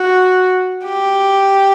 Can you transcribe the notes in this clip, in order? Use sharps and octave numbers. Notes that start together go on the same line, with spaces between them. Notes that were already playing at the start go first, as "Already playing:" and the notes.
Already playing: F#4
G4